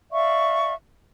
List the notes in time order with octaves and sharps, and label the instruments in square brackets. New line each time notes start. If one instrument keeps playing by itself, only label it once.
[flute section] D5 E5 F5 C#6